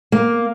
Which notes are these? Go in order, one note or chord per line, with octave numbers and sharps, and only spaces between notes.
A#3